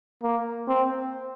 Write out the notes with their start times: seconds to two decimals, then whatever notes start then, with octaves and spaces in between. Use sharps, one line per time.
0.23 A#3
0.68 C4